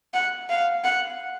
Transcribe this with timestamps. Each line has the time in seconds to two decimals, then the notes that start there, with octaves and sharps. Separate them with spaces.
0.14 F#5
0.50 F5
0.84 F#5